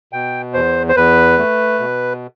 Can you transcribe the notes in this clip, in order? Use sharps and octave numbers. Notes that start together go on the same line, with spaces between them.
B2 G5
E2 C5
C5
E2 B4
A3
B2